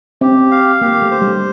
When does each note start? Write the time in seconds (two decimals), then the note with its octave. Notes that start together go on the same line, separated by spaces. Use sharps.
0.21 C4 G4
0.51 F5
0.81 A#3 G4
1.02 A3
1.11 C5
1.22 G3